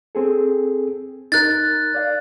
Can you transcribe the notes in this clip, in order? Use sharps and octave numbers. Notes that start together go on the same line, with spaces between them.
C4 G#4 A4
D#4 A#4 F#6 A6
D5 F5